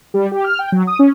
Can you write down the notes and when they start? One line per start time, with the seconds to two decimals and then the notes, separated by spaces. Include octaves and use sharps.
0.14 G3
0.32 G4
0.44 F6
0.59 G5
0.72 F#3
0.87 D#6
0.99 C#4